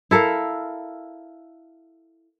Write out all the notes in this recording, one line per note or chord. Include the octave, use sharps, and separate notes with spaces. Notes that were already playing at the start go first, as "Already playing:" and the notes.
E4 A4 A#4 F5